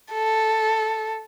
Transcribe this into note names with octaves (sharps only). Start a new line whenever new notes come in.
A4